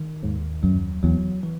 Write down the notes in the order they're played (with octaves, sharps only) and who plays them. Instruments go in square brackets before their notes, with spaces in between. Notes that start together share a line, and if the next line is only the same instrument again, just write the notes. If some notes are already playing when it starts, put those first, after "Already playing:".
Already playing: [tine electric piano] D#3
[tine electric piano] D#2 [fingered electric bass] G#2
[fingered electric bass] F#2 [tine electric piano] F#3
[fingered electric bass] E2 [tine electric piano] F#3
[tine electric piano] E3